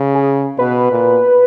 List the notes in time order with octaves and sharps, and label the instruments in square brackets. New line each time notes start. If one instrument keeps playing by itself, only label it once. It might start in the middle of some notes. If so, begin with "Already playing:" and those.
Already playing: [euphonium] C#3
[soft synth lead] G#4
[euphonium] B2 [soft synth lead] B4
[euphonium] A#2